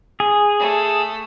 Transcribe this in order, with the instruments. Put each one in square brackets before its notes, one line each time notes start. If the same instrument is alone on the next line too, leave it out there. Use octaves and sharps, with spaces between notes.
[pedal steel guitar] G#4
[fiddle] A3